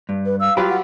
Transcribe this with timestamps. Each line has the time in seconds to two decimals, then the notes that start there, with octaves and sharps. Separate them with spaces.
0.09 G2
0.26 B4
0.40 F5 E6
0.57 F#3 F4 G4 B4
0.70 F#5